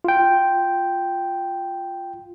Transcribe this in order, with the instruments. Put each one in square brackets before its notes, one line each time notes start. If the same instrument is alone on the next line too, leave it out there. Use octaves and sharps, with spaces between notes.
[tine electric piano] F4 G5